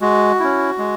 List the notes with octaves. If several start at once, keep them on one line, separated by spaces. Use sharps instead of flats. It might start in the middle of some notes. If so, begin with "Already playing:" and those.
G#3 F#4
C#4 E4
G#3